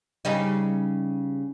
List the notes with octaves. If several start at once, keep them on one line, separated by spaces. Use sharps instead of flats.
C#3 G3 D#4